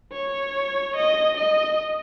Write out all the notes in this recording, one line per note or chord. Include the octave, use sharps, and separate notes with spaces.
C#5
D#5
D#5